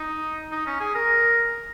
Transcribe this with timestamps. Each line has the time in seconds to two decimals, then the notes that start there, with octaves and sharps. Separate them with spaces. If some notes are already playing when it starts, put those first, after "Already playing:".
Already playing: D#4
0.52 D#4
0.66 C#4
0.80 G#4
0.95 A#4